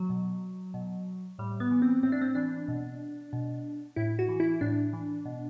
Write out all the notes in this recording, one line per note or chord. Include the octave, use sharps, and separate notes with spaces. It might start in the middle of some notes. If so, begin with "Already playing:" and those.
Already playing: F#3
B2
B2
A2 G3
B3
E3
C4
A2 C4
D4
C4
E3 D4
B2
B2
A2 E4
F#4
E3
E4
A2 D4
E3
B2